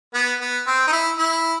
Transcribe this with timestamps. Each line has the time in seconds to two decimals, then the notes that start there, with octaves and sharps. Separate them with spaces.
0.15 B3
0.41 B3
0.67 C4
0.87 D#4
0.92 E4
1.19 E4